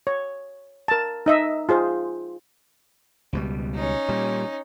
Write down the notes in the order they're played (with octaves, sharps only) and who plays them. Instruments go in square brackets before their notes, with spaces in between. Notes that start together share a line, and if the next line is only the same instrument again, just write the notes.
[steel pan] C#5
A#4 A5
D#4 D#5 E5
F4 G#4 C5
[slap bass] C#2 B2 G3
[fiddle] C#4 D#4
[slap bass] A#2 G3